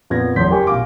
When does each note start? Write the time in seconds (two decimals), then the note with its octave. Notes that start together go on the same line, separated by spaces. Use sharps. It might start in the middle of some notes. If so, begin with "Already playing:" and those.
0.10 F2 A#2 B3 G#6 A#6
0.36 F#1 E2 C#5 C6 G6 B6
0.50 G4 A#4 G5 G#5 C6 C#6
0.67 A#1 B2 F5 G#5 D6